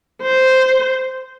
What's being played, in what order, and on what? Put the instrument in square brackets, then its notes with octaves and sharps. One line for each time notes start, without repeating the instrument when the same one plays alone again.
[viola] C5